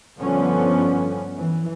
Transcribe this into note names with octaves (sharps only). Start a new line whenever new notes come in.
G1 D3 F3 B3 C#4
E3